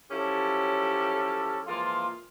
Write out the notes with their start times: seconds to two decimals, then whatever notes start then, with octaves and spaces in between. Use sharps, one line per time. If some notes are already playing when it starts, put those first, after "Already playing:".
0.11 F3 F#3 C#4 E4 G4 A4
1.67 E3 F3 G#3 A#3 F4